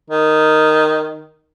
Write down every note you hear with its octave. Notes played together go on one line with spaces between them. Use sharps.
D#3